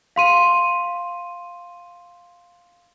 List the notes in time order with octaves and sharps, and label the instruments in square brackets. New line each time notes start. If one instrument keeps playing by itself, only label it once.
[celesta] F5 C6 D#7